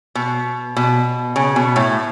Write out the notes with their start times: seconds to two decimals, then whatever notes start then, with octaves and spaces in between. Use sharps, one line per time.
0.15 B2
0.77 B2
1.36 C#3
1.56 B2
1.76 A2